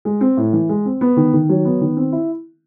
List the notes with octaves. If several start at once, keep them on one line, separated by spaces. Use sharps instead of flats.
G#3
C4
A2
E3
G#3
C4
B3
D#3
D#3
F#3
B3
D#3
C4
E4